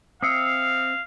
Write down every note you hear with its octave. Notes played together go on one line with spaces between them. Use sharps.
C4 E5 F5 D#6 C7 C#7